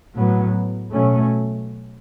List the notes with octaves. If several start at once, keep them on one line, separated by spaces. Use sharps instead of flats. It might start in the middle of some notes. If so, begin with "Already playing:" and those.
A2 F#3 B3
B2 F#3 A3 C#4